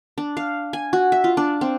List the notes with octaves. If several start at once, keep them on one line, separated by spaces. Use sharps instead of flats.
D4
F5
G#5
F#4
E5
F4
D4
C4